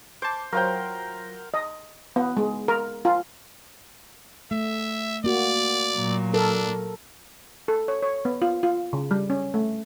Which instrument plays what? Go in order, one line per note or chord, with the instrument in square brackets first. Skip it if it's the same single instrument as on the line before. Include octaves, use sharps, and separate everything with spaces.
[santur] C5 [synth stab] A5 D6
[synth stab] F#3 F4 C5 [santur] A#4 F#5 G5
[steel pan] D#5
B3
G#3
A#4
F4
[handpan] A3 [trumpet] E5
[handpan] A#3 F#4 [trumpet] D5
[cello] A#2 F#3
[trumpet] D4 [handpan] A4 A#4
[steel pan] A4
C#5
C#5
B3
F4
F4
C#3
G3
C#4
A3